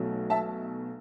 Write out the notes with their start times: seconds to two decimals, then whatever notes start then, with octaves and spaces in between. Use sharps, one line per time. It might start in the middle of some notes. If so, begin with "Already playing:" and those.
Already playing: B1 B2 F#3 A3
0.30 E5 A5